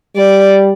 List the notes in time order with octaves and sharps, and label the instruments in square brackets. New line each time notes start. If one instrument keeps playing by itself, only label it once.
[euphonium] G3 [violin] D5